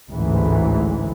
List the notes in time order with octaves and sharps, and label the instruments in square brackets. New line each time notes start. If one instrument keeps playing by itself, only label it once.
[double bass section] A1 D2 G#2 E3